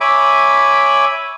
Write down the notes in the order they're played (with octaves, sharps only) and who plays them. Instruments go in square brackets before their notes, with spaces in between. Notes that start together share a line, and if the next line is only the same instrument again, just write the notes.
[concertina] C#5 E5 G#5 B5 D6